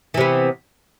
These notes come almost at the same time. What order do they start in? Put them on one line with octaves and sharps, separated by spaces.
E3 C3 B3